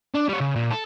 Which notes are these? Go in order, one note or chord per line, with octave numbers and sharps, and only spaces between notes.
D4
G3 C#5
C#3
A#2
A4